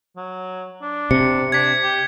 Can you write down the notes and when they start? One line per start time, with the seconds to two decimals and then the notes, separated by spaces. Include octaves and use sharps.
0.17 F#3
0.82 D4
1.11 C3 C#7
1.52 D4 G#6 B6
1.83 G4